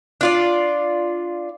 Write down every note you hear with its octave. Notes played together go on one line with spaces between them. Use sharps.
D4 F4 D5